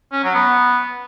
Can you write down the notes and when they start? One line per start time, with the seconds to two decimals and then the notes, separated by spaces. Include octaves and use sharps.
0.13 C#4
0.24 F#3
0.35 B3